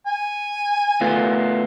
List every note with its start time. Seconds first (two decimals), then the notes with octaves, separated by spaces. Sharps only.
0.06 G#5
1.01 A3 B3 F4